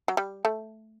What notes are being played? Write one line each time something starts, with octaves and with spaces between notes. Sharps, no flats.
F#3
G3
A3